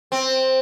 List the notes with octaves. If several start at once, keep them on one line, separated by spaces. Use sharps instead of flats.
C4